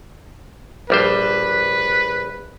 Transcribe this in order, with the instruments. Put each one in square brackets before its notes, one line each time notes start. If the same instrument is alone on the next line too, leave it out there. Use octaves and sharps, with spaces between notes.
[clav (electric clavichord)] A#1 G3 C5 [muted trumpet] B4